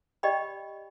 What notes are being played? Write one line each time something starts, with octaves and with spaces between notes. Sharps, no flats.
G4 D5 D#5 G5 B5